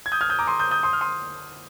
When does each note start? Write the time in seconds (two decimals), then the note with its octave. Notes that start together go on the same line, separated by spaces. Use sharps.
0.06 G#6
0.12 D#6 G6
0.21 F6 G#6
0.30 D#6 G6
0.39 A#5 D6
0.47 C6 D#6
0.60 D#6 G6
0.71 D#6 G6
0.83 C6 D#6
0.93 F6
1.01 C6 D#6